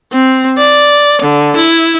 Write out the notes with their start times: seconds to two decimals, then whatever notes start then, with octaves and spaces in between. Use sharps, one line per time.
0.12 C4
0.58 D5
1.21 D3
1.56 E4